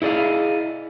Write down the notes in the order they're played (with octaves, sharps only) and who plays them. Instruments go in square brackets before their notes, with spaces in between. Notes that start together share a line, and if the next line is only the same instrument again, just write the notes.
[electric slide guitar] E4 G#4 D5 D#5 F5